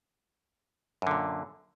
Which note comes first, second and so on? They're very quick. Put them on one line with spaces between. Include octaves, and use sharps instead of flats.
F#2 D3 A#2